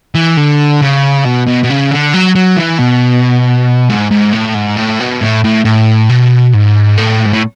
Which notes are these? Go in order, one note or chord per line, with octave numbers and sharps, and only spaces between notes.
E3
D3
C#3
B2
B2
B2
C#3
D3
F#3
F#3
E3
B2
G#2
G#2
A2
G#2
A2
B2
A2
A2
A2
B2
G#2
A2
G#2
A2